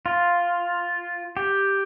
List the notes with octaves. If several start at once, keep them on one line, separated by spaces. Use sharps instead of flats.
F4
G4